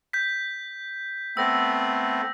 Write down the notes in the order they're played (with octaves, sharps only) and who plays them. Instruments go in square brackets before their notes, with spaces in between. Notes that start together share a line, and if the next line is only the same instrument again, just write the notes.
[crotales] G6 B6
[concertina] A3 B3 C4 [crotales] E6 A#6